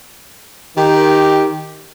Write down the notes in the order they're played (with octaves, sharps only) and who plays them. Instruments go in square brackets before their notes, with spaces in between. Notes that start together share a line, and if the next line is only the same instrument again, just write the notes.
[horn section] D#3 G4